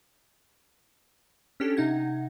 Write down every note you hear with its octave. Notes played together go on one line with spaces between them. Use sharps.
C#4 D4 G4 A4
C3 D#4 F#5 G#6